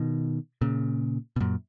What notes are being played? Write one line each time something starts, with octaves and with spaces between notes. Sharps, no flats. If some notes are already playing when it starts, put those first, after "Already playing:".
Already playing: B2 D#3
A#2 C#3
B2
F#2 A#2